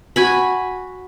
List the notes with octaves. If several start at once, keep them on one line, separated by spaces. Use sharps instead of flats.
F#4 G#5 B5